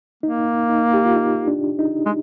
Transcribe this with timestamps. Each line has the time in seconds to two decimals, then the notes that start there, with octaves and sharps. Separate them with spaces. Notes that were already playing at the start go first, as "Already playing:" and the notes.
0.23 A#3 D#4
0.69 D#4
0.94 G4
1.05 F4
1.16 D#4
1.48 D4
1.79 D#4
2.06 G#3